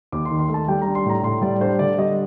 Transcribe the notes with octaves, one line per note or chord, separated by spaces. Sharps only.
D#2 D6
C6
D#3
C6
A3
A5
G3 G5
D4 A#5
C6
A2 A#5
A2 C6
G3 D5
D4 C5
D3 D5
G3 D#5